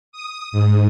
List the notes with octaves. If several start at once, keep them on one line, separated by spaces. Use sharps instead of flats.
D#6
G#2